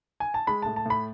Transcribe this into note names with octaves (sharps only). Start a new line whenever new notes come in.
G#5
A5
G#3 B5
A2 A5
A5
A2 B5